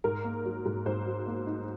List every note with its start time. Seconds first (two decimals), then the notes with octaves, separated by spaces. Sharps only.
0.04 G#2 A#4
0.25 A#3
0.45 F#3
0.66 G#2
0.86 G#2 C5
1.06 F#3
1.27 A#3
1.47 D#4